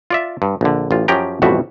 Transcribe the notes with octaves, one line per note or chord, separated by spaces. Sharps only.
F4 D5 E5
G2
A#1 D3
A1 F4
F#2 F3 C#4 G4 G5 A#5
A1 F2 B2 G3 F#4 E5